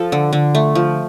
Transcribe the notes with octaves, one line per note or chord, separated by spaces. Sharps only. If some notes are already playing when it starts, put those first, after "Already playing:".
Already playing: F3 A4
D3
D3
A3
F3